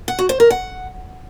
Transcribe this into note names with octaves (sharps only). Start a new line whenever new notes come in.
F#5
F#4
C5
A#4
F#5